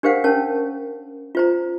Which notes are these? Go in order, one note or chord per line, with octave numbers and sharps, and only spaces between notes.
D4 G4 A#4 C5 F5 F#5
C#4 A#4 C#5 A5
F4 C5 A#5